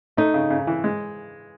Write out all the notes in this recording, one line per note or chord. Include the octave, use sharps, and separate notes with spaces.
A3 D#4
C#3
C#3
E3
G#3